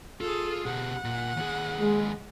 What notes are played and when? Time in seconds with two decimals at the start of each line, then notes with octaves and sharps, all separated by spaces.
0.21 F4 G#4 A4
0.66 B2 G4 F#5
1.04 A#2
1.37 D#2 G#4
1.80 G#3